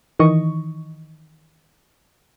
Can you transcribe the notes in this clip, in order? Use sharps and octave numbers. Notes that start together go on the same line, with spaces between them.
D#3 E3 D#5 C#6